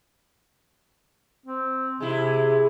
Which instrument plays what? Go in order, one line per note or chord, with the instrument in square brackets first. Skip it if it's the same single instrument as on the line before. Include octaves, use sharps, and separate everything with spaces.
[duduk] C4
[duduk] C3 [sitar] G#3 E4